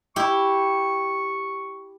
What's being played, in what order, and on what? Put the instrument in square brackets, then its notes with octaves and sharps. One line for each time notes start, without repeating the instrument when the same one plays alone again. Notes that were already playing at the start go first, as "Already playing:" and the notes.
[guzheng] E4 G4 [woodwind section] C#6